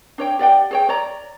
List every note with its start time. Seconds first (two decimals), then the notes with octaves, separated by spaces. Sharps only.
0.18 D4 C#5 G5
0.39 G4 D5 F#5 G5
0.71 G#4 C#5 G5
0.89 C#5 D5 A#5